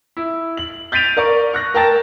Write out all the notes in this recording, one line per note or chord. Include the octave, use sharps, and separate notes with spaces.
E4
F#7
G6 A6 B6 D7 D#7 F7
A#4 D5 C#6
C#6 F#6 A#6
A#4 G5 A5 A6 A#6